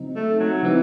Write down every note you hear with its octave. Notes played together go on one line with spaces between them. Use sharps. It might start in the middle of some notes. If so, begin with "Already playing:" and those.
Already playing: C#3 F#3 C4 D#4
A3
F#3
C#3 E3 F#3 C4 D#4